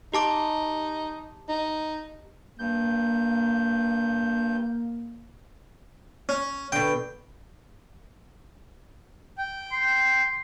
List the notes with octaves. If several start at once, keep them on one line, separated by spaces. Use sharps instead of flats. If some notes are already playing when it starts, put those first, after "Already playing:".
D#4 G4 A5 D6
D#4
G2 A#3 G6
C#4
B2 D3 G5
G5
C6